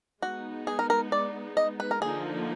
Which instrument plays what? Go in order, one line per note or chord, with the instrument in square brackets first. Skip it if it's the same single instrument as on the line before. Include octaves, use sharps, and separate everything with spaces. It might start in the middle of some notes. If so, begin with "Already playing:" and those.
[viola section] G#3 B3 D#4 [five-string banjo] F#4
[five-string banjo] G#4
A#4
A#4
D5
D#5
B4
A#4
[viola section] D3 F3 A#3 D#4 [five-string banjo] G#4